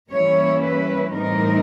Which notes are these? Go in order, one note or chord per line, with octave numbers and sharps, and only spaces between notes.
E3 G3 A#3 C#4 E4 C#5
B4
A2 E3 G3 C4 D#4 A#4